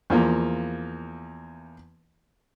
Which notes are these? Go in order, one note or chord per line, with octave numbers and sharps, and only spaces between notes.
E2 F3 A#3